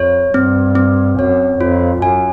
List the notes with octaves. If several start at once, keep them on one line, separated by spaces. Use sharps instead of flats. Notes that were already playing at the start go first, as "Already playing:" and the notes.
Already playing: F2 C#5
G2 C4
C4
F#2 C#5
F2 F4
F#2 G#5